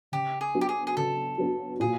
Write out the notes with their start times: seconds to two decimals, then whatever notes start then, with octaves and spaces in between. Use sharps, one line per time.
0.12 C#3 G4
0.41 G#4
0.55 F#3 B3 D4 F#4
0.61 G4
0.69 G#4
0.87 G#4
0.97 C#3 A4
1.38 F#3 B3 D4 F#4
1.80 A#2 G#4